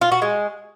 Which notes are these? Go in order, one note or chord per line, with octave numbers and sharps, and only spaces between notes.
F4
F#4
G#3